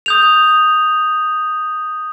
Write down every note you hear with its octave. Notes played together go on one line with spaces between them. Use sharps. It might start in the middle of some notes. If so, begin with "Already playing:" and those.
D#6 G6 F7